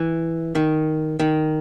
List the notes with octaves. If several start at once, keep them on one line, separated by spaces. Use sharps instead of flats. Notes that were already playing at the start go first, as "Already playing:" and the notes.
Already playing: E3
D#3
D#3